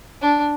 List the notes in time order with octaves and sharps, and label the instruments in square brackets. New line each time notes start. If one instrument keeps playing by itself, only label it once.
[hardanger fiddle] D4